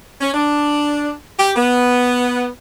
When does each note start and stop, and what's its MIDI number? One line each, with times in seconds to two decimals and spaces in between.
0.20 0.30 61
0.34 1.12 62
1.39 1.52 67
1.56 2.48 59